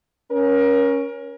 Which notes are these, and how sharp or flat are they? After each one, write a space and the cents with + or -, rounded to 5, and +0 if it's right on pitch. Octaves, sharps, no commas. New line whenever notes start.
C#4 +0 A#4 +30